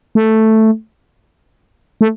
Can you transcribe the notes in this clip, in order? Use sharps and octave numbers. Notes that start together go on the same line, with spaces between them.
A3
A3